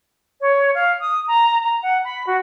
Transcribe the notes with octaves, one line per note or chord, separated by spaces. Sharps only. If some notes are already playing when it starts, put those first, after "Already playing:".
C#5
F5
D#6
A#5
A#5
F#5
B5
F#4